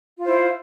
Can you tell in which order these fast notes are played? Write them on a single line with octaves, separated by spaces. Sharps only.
F4 C5 E4